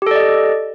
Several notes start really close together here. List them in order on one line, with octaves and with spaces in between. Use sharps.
G4 A4 D5 D#5